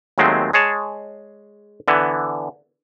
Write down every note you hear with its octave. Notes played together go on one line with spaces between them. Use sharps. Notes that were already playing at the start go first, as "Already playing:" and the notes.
D#2 D#3 F#3 G#3 A3 C4
G#3 G#4 C#5 A5
D3 E3 B3